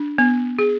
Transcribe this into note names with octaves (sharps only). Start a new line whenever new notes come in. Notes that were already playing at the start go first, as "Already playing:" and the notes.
Already playing: D4
B3
G#4